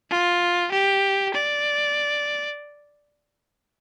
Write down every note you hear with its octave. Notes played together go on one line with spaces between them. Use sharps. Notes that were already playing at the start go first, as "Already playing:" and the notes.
F4
G4
D5